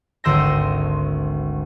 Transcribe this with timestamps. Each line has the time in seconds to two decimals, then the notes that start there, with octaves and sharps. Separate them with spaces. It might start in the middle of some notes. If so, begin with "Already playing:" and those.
0.24 G#1 D2 C6 E6 G6 A#6